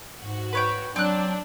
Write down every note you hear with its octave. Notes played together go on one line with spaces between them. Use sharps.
G#2 F#4
B4 C#5 G5
F#3 C4 D4 F#6